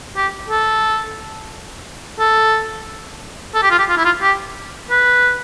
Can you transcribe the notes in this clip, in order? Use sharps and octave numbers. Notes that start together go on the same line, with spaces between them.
G4
A4
A4
A4
G4
F4
G4
F4
E4
F4
G4
B4